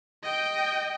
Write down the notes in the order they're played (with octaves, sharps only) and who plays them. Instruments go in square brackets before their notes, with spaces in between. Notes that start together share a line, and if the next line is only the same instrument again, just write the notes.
[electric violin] D#5 G5